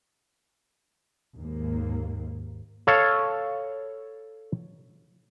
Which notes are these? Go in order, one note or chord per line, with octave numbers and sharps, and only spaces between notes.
D#2 G#2 A#3
A4 C#5 F5